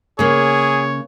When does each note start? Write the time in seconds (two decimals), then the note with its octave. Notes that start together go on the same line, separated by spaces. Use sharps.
0.19 C#3 A#3 G#4 C#5